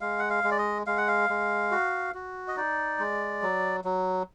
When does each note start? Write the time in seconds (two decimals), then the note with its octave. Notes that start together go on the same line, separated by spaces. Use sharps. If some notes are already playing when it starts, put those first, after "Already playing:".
0.01 G#3 F5
0.19 F#5
0.30 F5
0.44 G#3
0.51 D5
0.58 D#5
0.87 G#3 F5
0.97 F#5
1.08 F5
1.30 G#3
1.71 F#4
2.14 F#4
2.48 D#5
2.57 D#4 D5
2.99 G#3
3.42 F#3
3.84 F#3